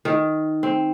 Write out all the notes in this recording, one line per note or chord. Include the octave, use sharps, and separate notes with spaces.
D#3
C4